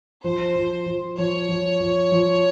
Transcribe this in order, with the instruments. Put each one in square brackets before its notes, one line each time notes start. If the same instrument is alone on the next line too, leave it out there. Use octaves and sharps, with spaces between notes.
[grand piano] F3 [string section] C5
[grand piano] F3
F3
[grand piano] F3 [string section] C#5
[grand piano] F3
F3
F3